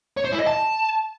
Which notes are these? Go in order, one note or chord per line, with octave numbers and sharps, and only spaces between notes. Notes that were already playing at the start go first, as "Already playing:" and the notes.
C#5
C5
E4
D#5
A5